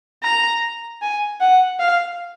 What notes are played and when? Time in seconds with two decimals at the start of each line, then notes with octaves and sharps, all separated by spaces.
0.23 A#5
1.02 G#5
1.40 F#5
1.80 F5